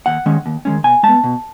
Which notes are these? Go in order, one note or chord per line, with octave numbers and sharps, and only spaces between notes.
D#2 F#5
D#3 G#3 C#4
D#2
D#3 G#3 C#4
B2 G#5
G#3 B3 A5
B2